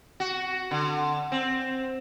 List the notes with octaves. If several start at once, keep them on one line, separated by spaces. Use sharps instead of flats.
F#4
D3
C4